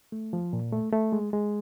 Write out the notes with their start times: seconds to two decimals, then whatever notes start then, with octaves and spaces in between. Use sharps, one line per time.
0.12 A3
0.33 F3
0.53 A#2
0.73 A3
0.93 A3
1.12 G#3
1.33 G#3